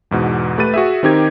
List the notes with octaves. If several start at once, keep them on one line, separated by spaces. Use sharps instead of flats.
E2 G#2 B2
A3 G4 B4 A6 D#7
F#4 G#4 E5
D#3 C4 D#4 G4 A#4 G#6